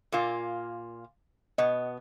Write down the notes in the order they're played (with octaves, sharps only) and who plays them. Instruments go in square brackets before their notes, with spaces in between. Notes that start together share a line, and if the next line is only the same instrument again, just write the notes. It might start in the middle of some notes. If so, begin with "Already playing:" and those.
[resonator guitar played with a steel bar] A#2 A#3 F4
[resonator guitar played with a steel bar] B2 B3 [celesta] D#5